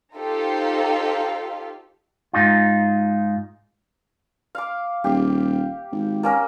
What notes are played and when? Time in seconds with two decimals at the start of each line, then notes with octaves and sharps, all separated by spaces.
0.14 D#4 F4 G4 A4 C5 F5
2.33 G#2 D#4 F4
4.55 F5 D6
5.04 D#1 G4
5.92 G#1
6.23 A#3 C#4 A#4